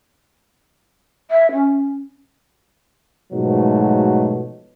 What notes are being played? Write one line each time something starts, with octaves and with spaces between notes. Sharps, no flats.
E5
C#4
G#2 B2 F3 F#3 A3